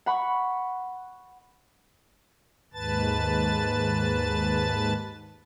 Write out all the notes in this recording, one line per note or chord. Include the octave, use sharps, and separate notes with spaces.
F#5 B5 C#6
D#2 G#2 B4 A5 A6